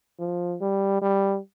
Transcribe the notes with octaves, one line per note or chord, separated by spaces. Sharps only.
F3
G3
G3